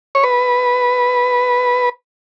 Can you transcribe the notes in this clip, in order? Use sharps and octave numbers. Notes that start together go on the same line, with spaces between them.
C#5
B4